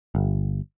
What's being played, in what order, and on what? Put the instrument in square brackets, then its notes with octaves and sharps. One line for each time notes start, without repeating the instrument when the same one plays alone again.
[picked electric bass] G1